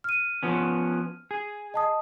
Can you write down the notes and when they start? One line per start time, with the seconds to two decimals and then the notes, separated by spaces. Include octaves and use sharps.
0.04 F6 D#7
0.43 F3 B3 C#4
1.31 G#4
1.74 D#5 A5 D#6